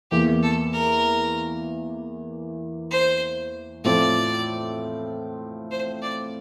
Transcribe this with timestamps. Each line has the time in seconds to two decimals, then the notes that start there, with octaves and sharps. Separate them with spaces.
0.11 E2 E3 A#3 G4
0.43 A4
0.73 A#4
2.91 C5
3.84 A2 F3 C4 D5
5.71 C5
6.02 D5